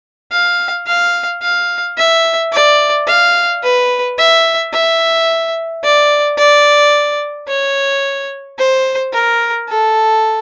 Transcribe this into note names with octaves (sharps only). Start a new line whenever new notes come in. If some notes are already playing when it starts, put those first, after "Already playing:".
F5
F5
F5
E5
D5
F5
B4
E5
E5
D5
D5
C#5
C5
A#4
A4